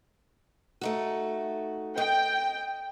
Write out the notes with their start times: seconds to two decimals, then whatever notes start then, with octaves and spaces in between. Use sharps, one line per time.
0.81 A3 D#4 F#4
1.98 D#5 G5